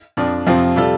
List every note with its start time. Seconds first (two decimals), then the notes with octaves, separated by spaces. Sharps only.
0.17 F2 F3 D4
0.47 F2 C3 F3 C4 F4
0.76 C3 G3 F4 A4